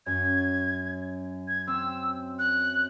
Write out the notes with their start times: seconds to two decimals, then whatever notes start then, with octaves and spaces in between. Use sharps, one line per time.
0.06 F#2 C#4 G#6
1.48 G#6
1.67 C4 E6
2.39 F#6